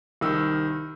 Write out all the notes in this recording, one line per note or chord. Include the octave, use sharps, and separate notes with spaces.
C2 D#3 E6